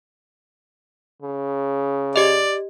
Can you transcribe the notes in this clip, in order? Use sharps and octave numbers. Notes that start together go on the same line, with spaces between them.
C#3
G4 D5 D#5